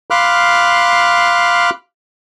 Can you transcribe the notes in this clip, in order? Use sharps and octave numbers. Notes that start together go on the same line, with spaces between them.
F5 B5 C6 D6 F6 F#6